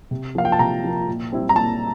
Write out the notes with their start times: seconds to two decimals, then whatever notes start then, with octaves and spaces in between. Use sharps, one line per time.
0.11 C3
0.35 F3 A#3 F5
0.45 G5
0.52 A5
0.59 C3 A#5
0.84 F3 A#3
1.07 A#2
1.32 G3 C4 E4
1.49 A#5
1.56 A#2 A5